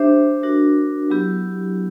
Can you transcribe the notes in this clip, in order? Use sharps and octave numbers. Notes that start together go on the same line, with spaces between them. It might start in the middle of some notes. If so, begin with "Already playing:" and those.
Already playing: D4 G4 C5 E5
D4 F#4 A#4
F#3 B3 E4 G4